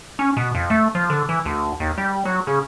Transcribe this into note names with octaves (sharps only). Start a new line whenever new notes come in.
C#4
B2
F2
A3
F3
D3
E3
D2
D#2
G3
F#3
C#3